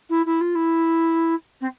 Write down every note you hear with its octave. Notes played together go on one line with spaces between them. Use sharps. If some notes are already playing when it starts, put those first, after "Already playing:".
E4
E4
F4
E4
C4